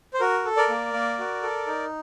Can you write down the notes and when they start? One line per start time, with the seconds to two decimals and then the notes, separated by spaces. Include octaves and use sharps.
0.14 C5
0.20 F#4 A#4
0.45 A4
0.57 A#4 D5
0.70 A#3
0.93 A#3
1.19 F#4
1.43 A4
1.67 D#4